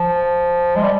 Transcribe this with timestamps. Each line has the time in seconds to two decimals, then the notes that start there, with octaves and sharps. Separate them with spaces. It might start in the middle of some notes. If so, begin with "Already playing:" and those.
Already playing: F3
0.76 G#3
0.83 G3